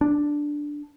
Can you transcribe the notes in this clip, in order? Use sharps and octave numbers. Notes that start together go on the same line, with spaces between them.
D4